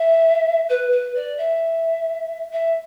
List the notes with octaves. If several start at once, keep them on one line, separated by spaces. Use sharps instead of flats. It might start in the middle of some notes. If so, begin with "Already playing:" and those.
Already playing: E5
B4
B4
D5
E5
E5